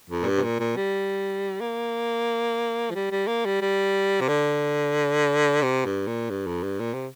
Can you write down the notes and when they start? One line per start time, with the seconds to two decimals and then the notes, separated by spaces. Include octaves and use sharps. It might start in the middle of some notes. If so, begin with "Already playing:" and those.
0.10 F2
0.23 A#2
0.26 G2
0.38 C3
0.43 A#2
0.59 A#2
0.76 G3
1.61 A#3
2.90 F3
2.95 G3
3.11 G3
3.27 A#3
3.45 G3
3.61 G3
4.20 C3
4.28 D3
5.62 C3
5.85 G2
6.07 A#2
6.30 G2
6.47 F2
6.63 G2
6.80 A#2
6.94 C3